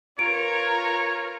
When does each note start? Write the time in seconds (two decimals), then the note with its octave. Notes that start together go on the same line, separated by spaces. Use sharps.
0.19 F4 A#4 B4 C#5 A#5 D7